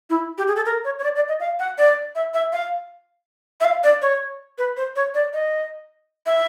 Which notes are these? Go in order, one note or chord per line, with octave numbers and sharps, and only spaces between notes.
E4
G4
G#4
A4
A#4
C#5
C#5
D5
D5
D#5
F5
F#5
D5
E5
E5
F5
E5
F5
D5
C#5
B4
C5
C#5
D5
D#5
E5